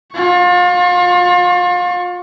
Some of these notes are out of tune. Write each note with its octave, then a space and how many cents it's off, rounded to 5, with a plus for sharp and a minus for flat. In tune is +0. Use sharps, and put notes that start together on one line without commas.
F4 +35 C#6 +0